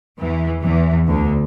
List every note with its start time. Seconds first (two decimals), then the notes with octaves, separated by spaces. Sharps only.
0.18 E2 E3
0.63 E2 E3
1.07 D2 D3